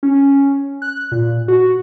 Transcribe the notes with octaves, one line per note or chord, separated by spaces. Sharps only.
C#4
F#6
A#2
F#4